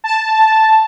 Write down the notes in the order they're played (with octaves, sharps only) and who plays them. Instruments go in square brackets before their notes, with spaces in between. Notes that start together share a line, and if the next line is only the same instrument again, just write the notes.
[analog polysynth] A5